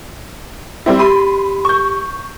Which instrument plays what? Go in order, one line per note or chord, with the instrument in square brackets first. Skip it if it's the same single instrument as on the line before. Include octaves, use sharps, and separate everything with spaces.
[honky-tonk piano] G3 C4 E4
[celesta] G4 B6 D#7 [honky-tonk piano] B5 C6
[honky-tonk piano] C#6 G6